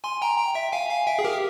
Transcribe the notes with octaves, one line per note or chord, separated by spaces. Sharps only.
G#5 C6
G5 A#5
G5 A#5
E5 G5
F5 G#5
F5 G#5
E5 G5
G#4
G4 A#4